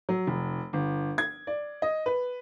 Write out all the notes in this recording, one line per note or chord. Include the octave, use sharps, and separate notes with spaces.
F#3
F1
G1
G#6
D5
D#5
B4